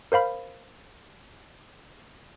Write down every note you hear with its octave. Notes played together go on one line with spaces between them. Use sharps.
A#4 C5 F5 B5